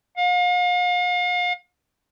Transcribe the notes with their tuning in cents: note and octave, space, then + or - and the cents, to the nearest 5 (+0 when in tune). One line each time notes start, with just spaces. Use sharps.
F5 +40